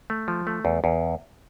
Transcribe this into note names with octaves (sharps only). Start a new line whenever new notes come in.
A3
F3
A3
E2
E2